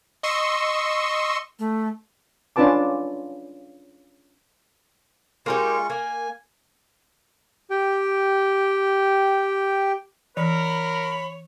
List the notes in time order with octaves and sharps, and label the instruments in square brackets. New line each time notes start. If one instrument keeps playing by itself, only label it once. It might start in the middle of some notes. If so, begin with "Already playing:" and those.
[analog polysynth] D#5 C6 C#6 E6
[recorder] A3
[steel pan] C#4 D4 F4 B4 A5 D6
[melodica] G#3 F4 C#6 [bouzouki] A#3 D#4 G4
[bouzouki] A#3 [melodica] G#5
[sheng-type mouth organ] G4 G5
[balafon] E3 [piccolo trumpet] A#4 [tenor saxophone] C#5 [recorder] B5